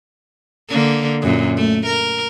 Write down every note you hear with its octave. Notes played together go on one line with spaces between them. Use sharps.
D3 A#3
F#2 A#2
A3
A#4